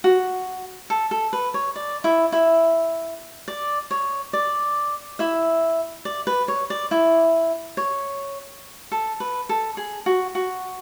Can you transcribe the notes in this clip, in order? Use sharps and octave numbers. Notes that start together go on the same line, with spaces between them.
F#4
A4
A4
B4
C#5
D5
E4 E5
E4 E5
D5
C#5
D5
E4 E5
D5
B4
C#5
D5
E4 E5
C#5
A4
B4
A4
G#4
F#4
F#4